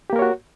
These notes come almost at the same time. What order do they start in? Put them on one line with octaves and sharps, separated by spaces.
G4 A#3 A#4 C#5 F#4